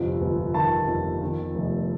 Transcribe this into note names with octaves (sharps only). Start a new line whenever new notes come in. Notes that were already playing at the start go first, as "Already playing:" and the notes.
Already playing: G1 F2 C3
G1
D#3 A5
F2
D#3
F1